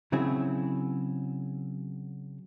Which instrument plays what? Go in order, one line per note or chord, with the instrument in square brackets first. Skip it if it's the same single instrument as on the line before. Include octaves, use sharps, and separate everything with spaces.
[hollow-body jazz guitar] C#3 F#3 C4 E4 G#4